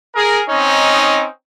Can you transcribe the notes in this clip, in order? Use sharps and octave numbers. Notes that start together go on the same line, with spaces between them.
G#4 A#4
C4 C#4 D#4